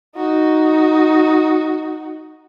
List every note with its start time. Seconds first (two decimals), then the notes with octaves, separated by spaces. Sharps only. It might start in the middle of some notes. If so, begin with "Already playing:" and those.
0.16 D#4 F#4